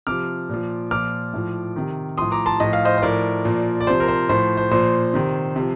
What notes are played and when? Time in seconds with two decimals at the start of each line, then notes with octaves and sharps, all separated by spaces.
0.07 C3 F3 D6 F6
0.49 A#2 F3
0.91 A#2 F3 D6 F6
1.33 A2 F3
1.76 C3 D#3
2.18 A2 F3 C6 D#6
2.32 A#5 D6
2.46 A5 C6
2.60 A2 F3 D#5
2.73 F5
2.85 C5 D#5
2.98 C5
3.02 A2 F3 A#4 D5
3.45 A#2 F3
3.81 D5
3.87 C3 F3 C5
4.00 A#4
4.08 C5
4.29 A2 F3 C5
4.57 C5
4.71 A#2 F3 C5
5.14 C3 D#3
5.56 C3 F3